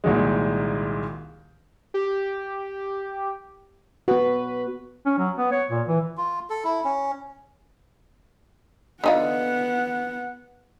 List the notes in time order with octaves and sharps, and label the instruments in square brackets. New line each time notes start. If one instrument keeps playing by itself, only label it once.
[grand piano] C2 A#2 D#3 F#3 G#3
[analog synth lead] G4
[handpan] B3 F#4 [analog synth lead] B4
[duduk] C#4
F#3
B3
C#5
A#2
E3
[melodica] F4
A4
E4
C#4
[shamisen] D3 D#4 F4 [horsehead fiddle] B3 F#5